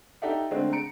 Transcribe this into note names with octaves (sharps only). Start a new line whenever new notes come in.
D#4 G4 A4 D5 E5 F#5
D3 G#3 A3 C4 D4
A#5 C#7 D7